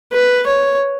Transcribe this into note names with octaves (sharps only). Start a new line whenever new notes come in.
B4
C#5